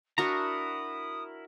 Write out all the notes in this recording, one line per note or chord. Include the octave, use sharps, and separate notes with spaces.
D4 E4 F#4 A#4 A#5 D#6